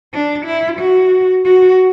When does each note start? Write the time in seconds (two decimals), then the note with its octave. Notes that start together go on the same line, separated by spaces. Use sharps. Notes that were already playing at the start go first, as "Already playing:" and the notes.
0.13 D4
0.45 E4
0.79 F#4
1.45 F#4